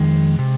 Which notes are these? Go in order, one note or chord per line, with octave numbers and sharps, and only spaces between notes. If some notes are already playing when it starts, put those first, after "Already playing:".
Already playing: F2 D#3 G#3
C3